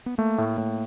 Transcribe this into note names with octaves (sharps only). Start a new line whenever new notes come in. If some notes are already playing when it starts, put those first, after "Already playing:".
B3
A3 A#3
A2
A2